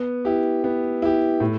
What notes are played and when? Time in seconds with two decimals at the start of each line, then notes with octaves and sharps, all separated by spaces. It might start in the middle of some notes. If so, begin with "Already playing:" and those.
Already playing: B3
0.25 E4 G4
0.64 B3
1.02 E4 G4
1.40 A2